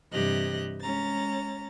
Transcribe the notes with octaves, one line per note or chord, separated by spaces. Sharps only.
G2 C3 E3 G4 D#5 F#6
G#3 C#4 A#5 A6